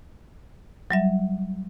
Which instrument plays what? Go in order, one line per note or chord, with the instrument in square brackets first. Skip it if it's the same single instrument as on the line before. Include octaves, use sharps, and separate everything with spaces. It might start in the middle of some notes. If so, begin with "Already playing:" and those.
[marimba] F#3 G3 E5